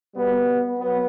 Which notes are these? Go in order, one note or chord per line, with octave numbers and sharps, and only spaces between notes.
B2 G3 B3
F#3 B3